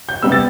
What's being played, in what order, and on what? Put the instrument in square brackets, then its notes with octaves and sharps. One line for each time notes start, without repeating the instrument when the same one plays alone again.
[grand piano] G6
C3 G3 B3 E6
A6